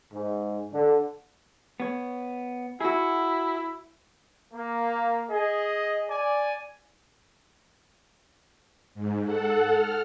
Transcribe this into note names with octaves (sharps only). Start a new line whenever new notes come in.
G#2
D3
B3 C#5
E4 F#4 G#4
A#3
G#4 D#5
D5 G#5
G#2
A4 F#5
F6